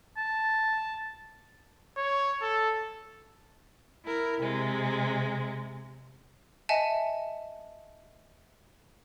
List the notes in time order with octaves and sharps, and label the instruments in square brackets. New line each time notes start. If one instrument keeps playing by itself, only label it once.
[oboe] A5
[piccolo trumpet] C#5
A4
[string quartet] E4 A#4
C3 G#3
[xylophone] D#5 E5 F#5 G#5 A5